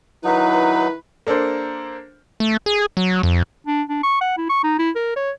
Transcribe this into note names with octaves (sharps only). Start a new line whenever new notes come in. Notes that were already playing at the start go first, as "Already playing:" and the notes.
D#3 F#3 D#4 E4 B4
A#3 D4 A4 A#4 C5
A3
G#4
F#3
F2
D4
D4
C#6
F#5
E4
C#6
D#4
E4
A#4
C#5